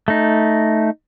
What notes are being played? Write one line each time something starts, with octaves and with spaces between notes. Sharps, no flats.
A3 D#4